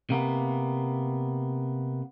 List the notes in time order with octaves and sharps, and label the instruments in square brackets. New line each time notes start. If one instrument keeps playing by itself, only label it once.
[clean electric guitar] C3 A#3 B3